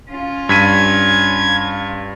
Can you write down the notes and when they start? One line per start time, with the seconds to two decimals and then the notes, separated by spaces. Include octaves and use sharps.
0.11 C#4 F4
0.49 G2 G#6 B6 D#7